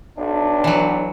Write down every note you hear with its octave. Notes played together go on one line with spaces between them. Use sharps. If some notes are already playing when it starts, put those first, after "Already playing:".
B1 D4
E3 F#3